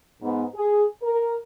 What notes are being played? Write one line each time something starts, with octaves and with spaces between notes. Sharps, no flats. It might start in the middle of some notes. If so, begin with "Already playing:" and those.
G#2 B3
G#4
A#4